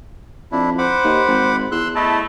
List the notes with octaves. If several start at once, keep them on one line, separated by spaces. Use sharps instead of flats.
F2 D4 E4
C5 F#5 B5 D6
D#2
G#1
E2 C6 E6 F#6
A3 E4 D#5 A5